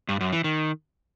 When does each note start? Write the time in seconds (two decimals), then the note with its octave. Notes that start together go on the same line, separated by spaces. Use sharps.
0.09 G2
0.20 F#2
0.32 E3
0.44 D#3